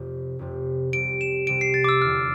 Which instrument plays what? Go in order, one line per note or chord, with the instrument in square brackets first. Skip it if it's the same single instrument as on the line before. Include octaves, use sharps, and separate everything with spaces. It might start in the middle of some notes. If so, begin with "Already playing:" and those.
Already playing: [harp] F1 F2 C3
F1 F2 C3
[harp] C2 C3 G3 [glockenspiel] D7
[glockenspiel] E7
[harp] C2 C3 G3 [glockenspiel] D7
[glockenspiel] C7
A6
D6
E6
[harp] F1 E2 D3 G3 C4 [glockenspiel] F6